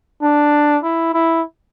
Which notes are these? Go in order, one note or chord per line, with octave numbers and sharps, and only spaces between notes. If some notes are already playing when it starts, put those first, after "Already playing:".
D4
E4
E4